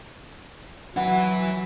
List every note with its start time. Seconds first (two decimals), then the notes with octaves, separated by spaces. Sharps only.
0.97 F#3 E4 B4 F#5